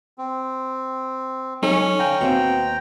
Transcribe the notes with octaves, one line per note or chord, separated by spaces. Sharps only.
C4
F#3 C#4 D#4 A4
D3 F5 G5 G#5 A#5
D#2 B2 A#3 C4